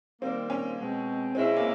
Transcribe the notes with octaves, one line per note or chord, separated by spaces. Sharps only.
D#3 G3 A#3 C4
C#4
B2 G#3 C4
B2 G#3 C4 C#4 E4 G#4
A#3